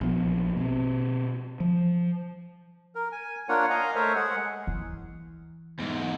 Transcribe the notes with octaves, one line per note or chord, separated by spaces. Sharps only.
A#1 F3 B3
B2 C4
F3
A#4
G#5
A#3 D4 F4 A#4 C#5 F#5
D#5 F5 G#5 A#5
A3 A#4 C5 C#5 E5
G#3 G#4 F#5
E3
E2 G#2